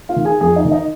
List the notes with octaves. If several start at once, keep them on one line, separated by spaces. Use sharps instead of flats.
F4 F5
D#3
G#4 G#5
F2 G#4 G#5
D#4 D#5
D#3
D#4 D#5